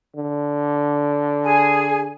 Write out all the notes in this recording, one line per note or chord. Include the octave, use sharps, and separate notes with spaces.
D3
G#4 G#5